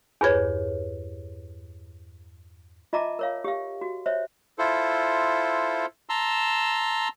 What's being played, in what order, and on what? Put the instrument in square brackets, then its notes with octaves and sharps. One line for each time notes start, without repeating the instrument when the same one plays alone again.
[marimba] E2 G2 G#6 [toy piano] G#4 B4 C#5
[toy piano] F4 D#5 E5 A5 A#5 D6
A#4 C#5 F5
G4 F5
F#4
C5 C#5 E5
[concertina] E4 F4 A4 C5
A5 A#5 C6 E6